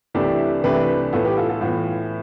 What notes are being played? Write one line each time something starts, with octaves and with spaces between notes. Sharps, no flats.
C2 C3 E3 A3 D4 E4 G4
C2 C3 E3 A3 D4 G4 B4
A2 E3 B3 F4 A4
G4 B4
F4 A4
F4 A4
A2 E3 B3 F4